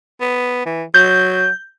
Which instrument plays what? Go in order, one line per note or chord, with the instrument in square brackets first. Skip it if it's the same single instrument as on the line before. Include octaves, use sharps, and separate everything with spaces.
[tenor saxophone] B3
E3
[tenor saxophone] F#3 [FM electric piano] G6